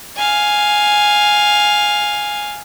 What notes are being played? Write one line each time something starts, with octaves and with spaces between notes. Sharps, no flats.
F5 G#5